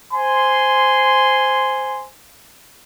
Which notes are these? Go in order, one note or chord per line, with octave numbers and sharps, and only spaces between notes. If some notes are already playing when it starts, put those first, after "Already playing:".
C5 G#5 C6